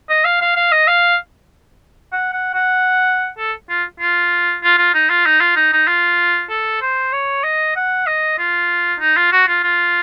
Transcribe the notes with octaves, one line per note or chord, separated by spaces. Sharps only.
D#5
F5
F5
F5
D#5
F5
F#5
F#5
F#5
A4
F4
F4
F4
F4
D#4
F4
D#4
F4
D#4
D#4
F4
A4
C5
C#5
D#5
F#5
D#5
F4
D#4
F4
F#4
F4
F4